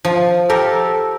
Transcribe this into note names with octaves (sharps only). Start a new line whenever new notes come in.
F3
G4 A4 A#4